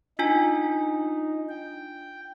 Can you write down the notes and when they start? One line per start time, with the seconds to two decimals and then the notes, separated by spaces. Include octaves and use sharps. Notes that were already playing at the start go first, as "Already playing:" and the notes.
0.19 D4 D#4 F4 G#5
1.49 G5